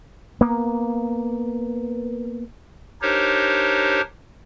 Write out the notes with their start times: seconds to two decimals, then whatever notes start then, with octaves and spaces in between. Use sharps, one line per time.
0.41 A#3 B3
3.02 D4 D#4 G4 A#4 C5 C#5